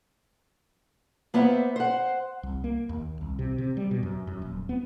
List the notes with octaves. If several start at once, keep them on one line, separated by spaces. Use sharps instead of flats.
A#3 B3 C5 E5 F#5
C5 F#5
C2
A#3
D#2
C2
C3
C3
G3
B2
F#2
F#2
D#1
B3